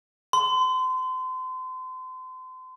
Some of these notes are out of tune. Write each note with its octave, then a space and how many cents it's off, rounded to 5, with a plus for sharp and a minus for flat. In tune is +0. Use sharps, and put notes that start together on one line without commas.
C6 -35